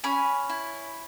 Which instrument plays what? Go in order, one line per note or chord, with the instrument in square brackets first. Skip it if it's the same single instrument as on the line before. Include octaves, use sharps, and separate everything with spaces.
[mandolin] C#4 G#5 B5
E4